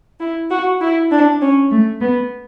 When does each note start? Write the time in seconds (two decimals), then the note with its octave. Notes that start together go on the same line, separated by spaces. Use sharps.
0.19 E4
0.50 F#4
0.80 E4
1.10 D4
1.41 C#4
1.71 A3
2.01 B3